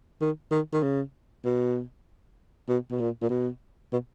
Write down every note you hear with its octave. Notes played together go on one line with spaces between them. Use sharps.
D#3
D#3
D#3
C#3
B2
B2
B2
A#2
A#2
B2
B2